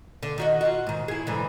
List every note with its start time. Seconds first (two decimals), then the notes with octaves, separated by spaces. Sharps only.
0.23 D3
0.38 D#3 F#4 D#5
0.61 F4 F#4
0.87 G#2 D#3
1.08 E4 G#4
1.27 G#2 D3 E3